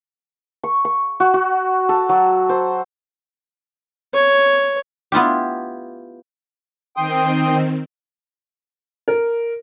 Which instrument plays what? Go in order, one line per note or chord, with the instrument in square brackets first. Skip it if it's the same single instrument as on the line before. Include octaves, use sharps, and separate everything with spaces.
[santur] C#6
C#6
F#4
F#4
A4
F#3
C5
[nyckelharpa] C#5
[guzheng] B3 E4 F4 G4
[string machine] D#3 C4 [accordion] G5 C6 D#6
[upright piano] A#4